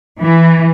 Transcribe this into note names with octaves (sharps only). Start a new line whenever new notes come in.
E3